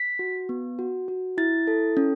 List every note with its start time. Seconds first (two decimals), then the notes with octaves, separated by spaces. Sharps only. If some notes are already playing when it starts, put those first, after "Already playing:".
Already playing: B6
0.19 F#4
0.49 B3
0.79 F#4
1.08 F#4
1.38 E4 A6
1.67 A4
1.97 C#4